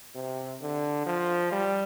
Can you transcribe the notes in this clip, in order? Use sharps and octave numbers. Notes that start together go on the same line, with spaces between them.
C3
D3
F3
G3